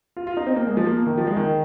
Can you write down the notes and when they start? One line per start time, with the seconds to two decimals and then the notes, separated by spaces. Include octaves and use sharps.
0.17 F4
0.27 F4
0.37 D#4
0.47 C4
0.56 A#3
0.67 G#3
0.77 F3
0.87 A#3
0.97 A#3
1.06 D#3
1.17 F3
1.27 G#3
1.37 D#3